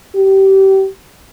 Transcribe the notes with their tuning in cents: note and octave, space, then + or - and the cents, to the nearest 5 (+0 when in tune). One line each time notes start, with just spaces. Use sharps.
G4 -25